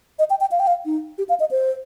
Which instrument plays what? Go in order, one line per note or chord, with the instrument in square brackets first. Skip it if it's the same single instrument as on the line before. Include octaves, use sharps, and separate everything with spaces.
[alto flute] D#5
G5
G5
F5
G5
F5
D#4
G4
F5
D#5
C5